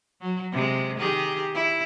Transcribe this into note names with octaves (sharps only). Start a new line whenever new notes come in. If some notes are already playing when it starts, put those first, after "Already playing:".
F#3
C3 G#3
D#3 G4 G#4
E4